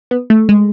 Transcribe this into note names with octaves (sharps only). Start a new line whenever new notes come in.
B3
A3
G#3